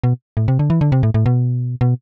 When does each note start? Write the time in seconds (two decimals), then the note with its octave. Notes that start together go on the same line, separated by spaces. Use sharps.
0.04 B2
0.37 A2
0.48 C3
0.59 D3
0.70 E3
0.81 D3
0.92 C3
1.03 A2
1.14 A2
1.26 B2
1.81 B2